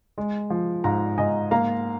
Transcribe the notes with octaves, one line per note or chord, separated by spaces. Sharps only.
G#3
F3
G#2 F5 A#5
G#2 D#5 G#5
A#3 F5 A#5